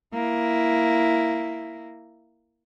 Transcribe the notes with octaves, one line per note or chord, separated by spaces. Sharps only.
A#3 E4